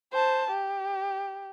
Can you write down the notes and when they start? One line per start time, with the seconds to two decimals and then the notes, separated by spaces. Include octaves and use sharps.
0.13 C5 A5
0.51 G4